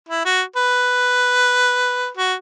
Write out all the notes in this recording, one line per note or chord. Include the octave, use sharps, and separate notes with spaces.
E4
F#4
B4
F#4